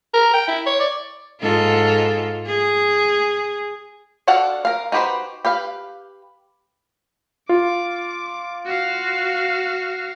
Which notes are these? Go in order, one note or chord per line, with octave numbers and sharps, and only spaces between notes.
A#4
G5
E4
C#5
D5
G#2 F4 A4
G#4
D4 F#4 A4 F5 F#5
A#4 F5
D#4 F#4 G4 B4 C5
G4 B4 F5
F4 D6
F#4 F5